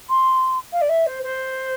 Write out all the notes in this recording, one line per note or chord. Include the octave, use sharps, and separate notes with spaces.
C6
F5
D5
E5
C5
C5